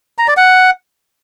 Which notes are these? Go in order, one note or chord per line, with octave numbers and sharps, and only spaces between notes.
A#5
D5
F#5